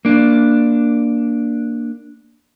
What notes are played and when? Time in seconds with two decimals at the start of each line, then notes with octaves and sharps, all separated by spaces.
0.05 A#3 D4